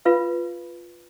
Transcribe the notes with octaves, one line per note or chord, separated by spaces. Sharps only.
F4 B4 F5